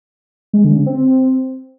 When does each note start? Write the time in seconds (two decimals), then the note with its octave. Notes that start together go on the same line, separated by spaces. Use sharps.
0.53 G#3
0.64 D3
0.75 C#3
0.86 C4